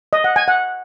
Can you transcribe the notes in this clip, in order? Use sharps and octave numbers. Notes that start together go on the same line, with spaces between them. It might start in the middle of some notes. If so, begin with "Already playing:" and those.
D#5
F#5
G#5
F#5